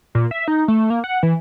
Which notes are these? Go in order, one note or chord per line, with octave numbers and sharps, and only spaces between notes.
A#2
E5
D#4
A3
A#3
F#5
E3